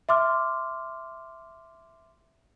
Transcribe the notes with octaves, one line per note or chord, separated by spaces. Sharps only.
E5 C6 D6 F6